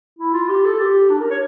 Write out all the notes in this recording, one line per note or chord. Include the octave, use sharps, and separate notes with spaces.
E4
F4
G4
A4
G4
D4
A#4
C#5